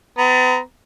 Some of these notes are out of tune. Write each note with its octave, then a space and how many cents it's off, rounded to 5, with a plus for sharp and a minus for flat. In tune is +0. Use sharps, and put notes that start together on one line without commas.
B3 +40 A#5 +0